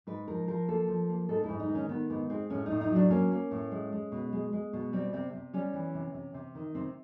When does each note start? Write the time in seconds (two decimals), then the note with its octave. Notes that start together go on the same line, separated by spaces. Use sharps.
0.07 G#2 B4
0.28 F3 A#4
0.48 F3 A#4
0.68 A#3 A4
0.88 F3
1.09 A#3
1.29 G#2 A4
1.44 E4
1.49 G#2
1.60 D#4
1.69 D#3
1.75 C#4
1.89 D#3 B3
2.10 G#2 B3
2.30 G#3 C4
2.50 A2 C#4
2.66 D#4
2.71 A2
2.81 D#4
2.91 F#3 D4
3.10 A#3 C#4
3.32 A#3
3.51 A2
3.72 G#3
3.92 G#3
4.12 B2
4.33 G#3
4.53 G#3
4.73 B2
4.93 G3 C4
5.13 C3 C4
5.33 C3
5.54 G3 C#4
5.74 E3
5.94 C3
6.14 C3
6.34 C3
6.55 D#3
6.75 C3 C4